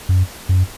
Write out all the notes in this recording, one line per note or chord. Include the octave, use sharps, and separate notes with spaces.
F#2
F#2